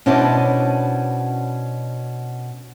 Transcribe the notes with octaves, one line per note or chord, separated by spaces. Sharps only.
B2 C#4 D4 E4 C5 A5